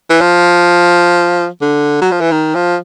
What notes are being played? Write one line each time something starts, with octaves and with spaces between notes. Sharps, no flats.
E3
F3
D3
F#3
F3
E3
D#3
F3